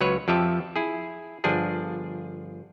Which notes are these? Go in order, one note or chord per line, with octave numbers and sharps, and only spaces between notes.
C#2 F#3 B4 C#5
F2 F3 G4 E5 A5
E4 G#4
G1 F3 D4 G#4